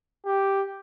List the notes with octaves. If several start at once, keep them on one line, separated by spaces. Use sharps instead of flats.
G4